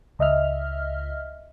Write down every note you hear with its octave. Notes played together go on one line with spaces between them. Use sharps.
C#2 D#5 E5 F6